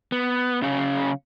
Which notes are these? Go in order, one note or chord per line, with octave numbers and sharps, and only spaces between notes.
B3
C#3 F#3 C#4 C#5 F5